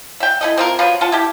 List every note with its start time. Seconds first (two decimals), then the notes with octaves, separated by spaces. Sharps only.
0.20 E5 G5
0.41 E4 A4 D#5
0.57 C4 F4 A#4
0.79 F3 F#3 F4 B4
1.01 F4 F#5 A5
1.12 E4 G4